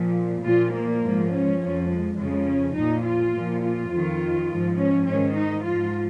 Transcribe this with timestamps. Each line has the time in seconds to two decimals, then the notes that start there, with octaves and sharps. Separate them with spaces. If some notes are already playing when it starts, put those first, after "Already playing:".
Already playing: A#2 F3
0.43 A#2 F3 F4
0.73 A#3
1.01 G#2 F3
1.31 C#4
1.59 F2 F3
1.89 G#3
2.17 F2 C#3 F3 G#3
2.47 C#4
2.75 A#2 F3 D#4
3.04 F4
3.34 A#2 F3
3.62 F4
3.91 F2 D#3
4.49 G#2 F3
4.77 C#4
5.07 G#2 D#3 C#4
5.36 D#4
5.65 G#2 F3 F4